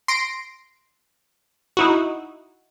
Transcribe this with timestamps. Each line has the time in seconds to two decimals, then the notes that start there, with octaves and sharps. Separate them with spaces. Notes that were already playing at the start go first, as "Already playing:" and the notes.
0.08 C6 A#6 D7
1.77 D#4 E4 F#4